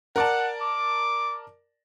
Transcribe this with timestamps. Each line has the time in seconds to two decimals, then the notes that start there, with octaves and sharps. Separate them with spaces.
0.16 A#4 D5 F#5 A5
0.61 D6